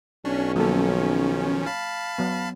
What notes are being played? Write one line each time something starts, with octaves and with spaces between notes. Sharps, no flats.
B1 C#4 D4
D#3 F3 F#3 A#3 A4
F5 A5 B5
F#3 B3